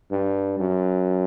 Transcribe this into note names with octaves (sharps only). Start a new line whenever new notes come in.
G2
F#2